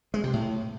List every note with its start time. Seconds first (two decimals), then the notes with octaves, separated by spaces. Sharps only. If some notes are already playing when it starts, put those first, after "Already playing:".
0.14 G#3
0.24 C3
0.33 A2